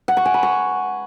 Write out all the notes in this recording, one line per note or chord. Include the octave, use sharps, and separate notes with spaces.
F#5
C#6
G#5
B5
C#6